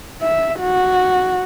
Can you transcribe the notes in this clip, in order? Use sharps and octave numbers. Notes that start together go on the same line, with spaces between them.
E5
F#4